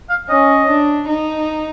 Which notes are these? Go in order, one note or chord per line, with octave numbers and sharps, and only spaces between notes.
F5
C#4 D#5
D4
D#4